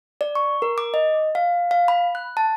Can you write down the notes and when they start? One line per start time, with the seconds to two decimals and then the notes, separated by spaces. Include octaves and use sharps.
0.21 D5
0.35 C#6
0.62 A#4
0.78 D6
0.94 D#5
1.35 F5
1.71 F5
1.88 B5
2.15 F#6
2.37 A5